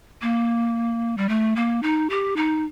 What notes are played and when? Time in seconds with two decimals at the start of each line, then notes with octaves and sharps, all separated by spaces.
0.22 A#3
1.17 G3
1.29 A3
1.56 A#3
1.83 D#4
2.10 G4
2.36 D#4